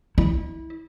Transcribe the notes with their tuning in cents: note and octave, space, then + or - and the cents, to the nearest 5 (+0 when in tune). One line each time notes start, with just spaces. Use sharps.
E4 -25